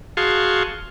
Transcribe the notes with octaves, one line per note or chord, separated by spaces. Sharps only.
F#4 G#4 F5 A5 C6 C#6